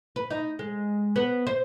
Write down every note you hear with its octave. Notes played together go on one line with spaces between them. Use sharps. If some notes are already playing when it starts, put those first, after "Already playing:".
B4
D#4
G#3
B3
C5